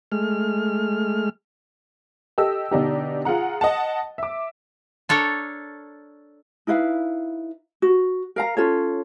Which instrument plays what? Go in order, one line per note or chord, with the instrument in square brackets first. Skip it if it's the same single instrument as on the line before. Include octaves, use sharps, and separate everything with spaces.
[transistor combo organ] G#3 A3 F6
[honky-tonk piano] G4 A4 D#5 E6
B2 D3 D4 D#4 G4
F4 G#4 F#5 A#5
D#5 F#5 A5
E5 D6
[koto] D4 A4 A#4 C#5 A#5
[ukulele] D#4 E4 B4 F5
F#4
A#4 F5 A#5
C#4 F4 A4 C#5